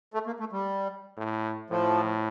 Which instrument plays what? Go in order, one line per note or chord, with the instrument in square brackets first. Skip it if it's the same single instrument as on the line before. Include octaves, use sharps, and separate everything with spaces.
[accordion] A3
A#3
A3
G3
[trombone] A2
[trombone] A2 [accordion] F3